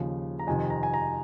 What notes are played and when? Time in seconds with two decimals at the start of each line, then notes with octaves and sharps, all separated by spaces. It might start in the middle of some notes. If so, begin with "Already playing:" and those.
Already playing: D#2 C#3 F3
0.39 A#5
0.47 F2 C3 D#3 G#5
0.70 A#5
0.83 G#5
0.94 A#5